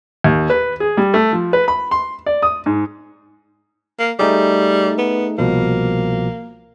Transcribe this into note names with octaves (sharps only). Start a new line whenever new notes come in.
D#2
B4
G#4
G3
A3
F3
B4
B5
C6
D5
D#6
G#2
A#3
G3 A3 D#4 G#4
B3
C2 B2 F3 A#3